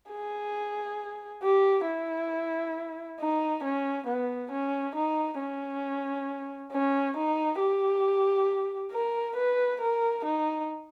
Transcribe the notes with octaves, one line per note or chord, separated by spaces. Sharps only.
G#4
G4
E4
D#4
C#4
B3
C#4
D#4
C#4
C#4
D#4
G4
A#4
B4
A#4
D#4